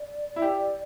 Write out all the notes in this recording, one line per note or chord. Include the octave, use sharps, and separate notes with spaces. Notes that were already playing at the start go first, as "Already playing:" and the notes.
Already playing: D5
E4
G4